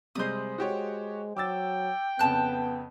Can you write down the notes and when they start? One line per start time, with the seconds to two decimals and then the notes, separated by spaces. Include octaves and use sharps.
0.15 C3 G3 G#3 C5 D#6
0.58 G#3 F#4 G4 C#5
1.37 F#3 G5 D6 E6 A6
2.19 F2 C#3 B3 A5 F#6